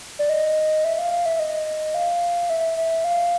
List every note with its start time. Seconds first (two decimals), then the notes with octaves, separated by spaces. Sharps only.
0.19 D5
0.29 D#5
0.84 E5
0.98 F5
1.12 F5
1.26 E5
1.39 D#5
1.94 F5
2.50 E5
2.77 E5
3.04 F5